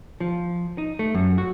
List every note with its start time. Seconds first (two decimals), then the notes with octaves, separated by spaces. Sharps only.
0.20 F3
0.78 D#4
0.99 A3
1.14 F#2
1.38 F#4